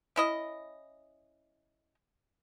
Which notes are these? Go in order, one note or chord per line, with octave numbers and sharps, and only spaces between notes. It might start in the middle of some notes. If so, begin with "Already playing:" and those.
C#4 E4 D#5